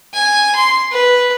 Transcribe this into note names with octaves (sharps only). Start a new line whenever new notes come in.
G#5
C6
B4